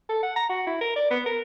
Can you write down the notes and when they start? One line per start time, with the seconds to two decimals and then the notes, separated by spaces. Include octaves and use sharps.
0.09 A4
0.23 F#5
0.36 A#5
0.49 F#4
0.67 E4
0.81 A#4
0.96 D5
1.11 B3
1.26 A#4